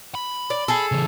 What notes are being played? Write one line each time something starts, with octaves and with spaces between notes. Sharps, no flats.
B5
D5
G#4 A4
C#3 E3